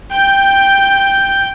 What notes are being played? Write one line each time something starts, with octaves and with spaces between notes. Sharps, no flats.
G5 G6